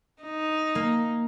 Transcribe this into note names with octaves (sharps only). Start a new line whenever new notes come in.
D#4
A#3